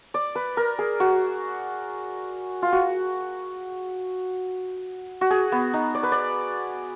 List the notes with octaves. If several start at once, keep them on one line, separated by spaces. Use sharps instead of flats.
D5
B4
A#4
G#4
F#4
F4
F#4
F#4
G#4
B3
D#4
D5
B4
D5